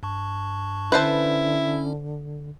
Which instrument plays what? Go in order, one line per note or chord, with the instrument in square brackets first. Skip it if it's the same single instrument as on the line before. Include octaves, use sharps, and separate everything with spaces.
[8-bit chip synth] G2 A5 C#6
[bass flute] D3 [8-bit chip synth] C#4 [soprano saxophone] E4 [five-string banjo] B4 C5 A5